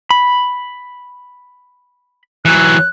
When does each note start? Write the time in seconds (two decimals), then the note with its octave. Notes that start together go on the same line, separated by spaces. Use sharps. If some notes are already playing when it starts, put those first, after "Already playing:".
0.11 B5
2.45 E3 F#3 F#6